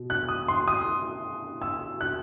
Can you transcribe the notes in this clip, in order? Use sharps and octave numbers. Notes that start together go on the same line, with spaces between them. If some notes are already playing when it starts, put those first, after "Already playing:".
Already playing: B2
F#6
D#6
C6
D#6
E6
F#6